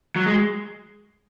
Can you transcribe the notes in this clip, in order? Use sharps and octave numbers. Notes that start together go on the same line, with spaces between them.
F#3
G#3